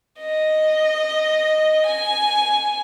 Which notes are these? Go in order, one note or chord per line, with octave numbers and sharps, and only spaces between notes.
D#5
G#5